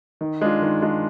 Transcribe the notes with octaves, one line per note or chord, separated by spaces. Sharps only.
D#3
G#3 D4 F4
D#3
G#3 D4 F4